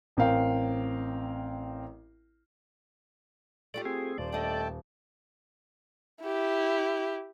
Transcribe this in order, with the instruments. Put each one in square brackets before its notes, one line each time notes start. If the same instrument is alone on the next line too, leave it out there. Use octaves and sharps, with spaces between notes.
[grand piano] A1 C4 A#4 F5 G5
[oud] A3 F4 G4 [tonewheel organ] D5
[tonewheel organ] C4 G#4
[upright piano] D#1 [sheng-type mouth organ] C5 [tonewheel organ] D5
[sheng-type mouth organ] A3 G5 A5 [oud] D4 D#5
[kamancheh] E4 G4